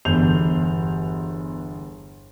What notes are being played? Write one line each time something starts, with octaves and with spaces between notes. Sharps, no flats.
G1 E2 G6 F7